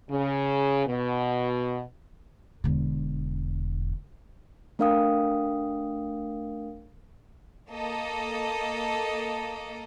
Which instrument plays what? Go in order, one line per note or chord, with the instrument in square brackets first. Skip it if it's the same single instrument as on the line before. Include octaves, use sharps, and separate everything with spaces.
[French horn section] C#3
B2
[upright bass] E1 D3
[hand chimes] A3 D4 A#4 F5 G5 D#6
[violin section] A#3 A4 D#5